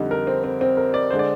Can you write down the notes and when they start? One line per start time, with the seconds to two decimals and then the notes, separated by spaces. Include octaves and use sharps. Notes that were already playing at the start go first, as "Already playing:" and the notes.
Already playing: F2 D3 G3 D#4
0.11 A#4
0.27 C4
0.44 C4
0.61 C4
0.77 A#4
0.94 D5
1.11 D3 G#3 C5
1.19 D5